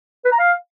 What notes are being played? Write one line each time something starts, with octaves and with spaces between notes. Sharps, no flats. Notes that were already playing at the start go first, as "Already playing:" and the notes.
B4
A#5
F5